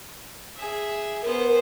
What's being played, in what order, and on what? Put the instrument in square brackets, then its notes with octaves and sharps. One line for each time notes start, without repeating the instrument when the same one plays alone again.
[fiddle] G#4 E5
[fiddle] B3 C5 [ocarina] A#4